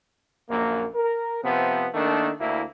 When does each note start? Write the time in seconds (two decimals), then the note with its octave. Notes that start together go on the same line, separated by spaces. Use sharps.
0.49 A#1 F#2 A#3
0.95 A#4
1.44 C3 F3 B3
1.94 D#3 A3 A#3 D4
2.40 D2 A#3 E4